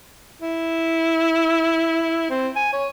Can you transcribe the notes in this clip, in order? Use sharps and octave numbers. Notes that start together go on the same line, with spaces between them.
E4
C4
G#5
C#5